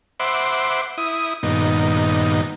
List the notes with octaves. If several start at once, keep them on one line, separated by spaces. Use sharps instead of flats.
C5 E5 F#5 B5 C6 D6
E4 D#6
G2 A#2 D#3 B3 D#4